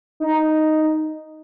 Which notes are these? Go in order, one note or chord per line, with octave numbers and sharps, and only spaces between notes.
D#4